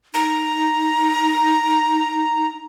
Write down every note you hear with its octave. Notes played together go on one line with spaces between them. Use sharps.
D#4 A#5